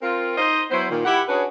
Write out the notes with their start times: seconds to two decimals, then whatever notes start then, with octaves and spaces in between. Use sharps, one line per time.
0.01 C4 F4 A#4
0.38 D#4 C5 D#5
0.71 F#3 B3 E4 C5
0.89 A#2 D#3
1.05 E4 G4 F#5
1.28 C#4 D4 F#4 G#4 B4 C#5